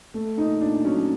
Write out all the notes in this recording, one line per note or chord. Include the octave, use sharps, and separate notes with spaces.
A3
A#2 D#4
A#2 D4
F#3 C#4